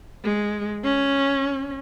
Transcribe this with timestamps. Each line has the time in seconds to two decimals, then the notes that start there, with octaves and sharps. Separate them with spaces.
0.24 G#3
0.84 C#4